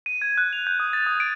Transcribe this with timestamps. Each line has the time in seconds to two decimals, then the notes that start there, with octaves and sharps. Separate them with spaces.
0.06 D#7
0.22 G#6
0.38 F#6
0.53 F7
0.67 G6
0.80 D#6
0.93 A6
1.06 D#6
1.20 D7